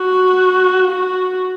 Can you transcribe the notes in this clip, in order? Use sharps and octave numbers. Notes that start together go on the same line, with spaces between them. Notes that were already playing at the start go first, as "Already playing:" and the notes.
Already playing: F#4
F#4